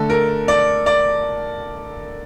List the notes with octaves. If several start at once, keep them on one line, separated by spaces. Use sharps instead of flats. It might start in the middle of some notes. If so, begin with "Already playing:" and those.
Already playing: D3 A3 A4
A#4
D5
D5